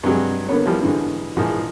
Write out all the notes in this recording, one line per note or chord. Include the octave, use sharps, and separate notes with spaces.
G2 C3 F#3 G#3
D3 A#3 B3 C#5
E3 F3 G3
G#2 D3 E3
A#1 G#2 E3 F3